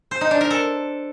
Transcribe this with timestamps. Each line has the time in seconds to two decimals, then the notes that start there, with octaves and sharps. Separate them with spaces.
0.11 C5
0.21 D#4
0.31 D4
0.41 A#4
0.50 A4